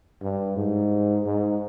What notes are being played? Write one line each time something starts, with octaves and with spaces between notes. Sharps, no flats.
G2
G#2
G#2